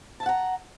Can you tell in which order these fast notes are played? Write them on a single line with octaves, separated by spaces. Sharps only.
A5 E5 F#5 A#5